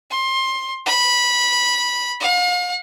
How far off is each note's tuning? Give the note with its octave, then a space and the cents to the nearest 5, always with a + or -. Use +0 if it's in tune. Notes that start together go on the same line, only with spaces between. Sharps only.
C6 +20
B5 -15
F5 +40